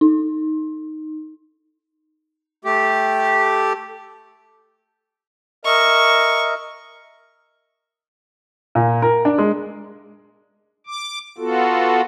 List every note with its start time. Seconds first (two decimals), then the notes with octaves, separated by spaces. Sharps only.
0.01 D#4
2.65 A3 G4
5.65 A#4 D#5 E5 C#6
8.75 A#2
9.02 A#4
9.25 D4
9.38 G#3
10.87 D6
11.38 B3 F4 F#4 A4